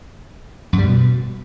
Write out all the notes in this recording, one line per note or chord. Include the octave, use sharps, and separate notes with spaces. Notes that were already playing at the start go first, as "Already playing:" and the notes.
F#2
G3
B2